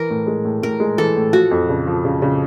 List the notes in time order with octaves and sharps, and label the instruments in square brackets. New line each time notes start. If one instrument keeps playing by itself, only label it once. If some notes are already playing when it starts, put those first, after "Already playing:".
Already playing: [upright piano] E3 [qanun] A#4
[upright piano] A2
G#3
A2
[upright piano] A2 [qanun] A#4
[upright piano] G#3
[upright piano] E3 [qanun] A4
[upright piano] A2
[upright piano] F3 [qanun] F#4
[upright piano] F2
C#3
F3
C#3
C#3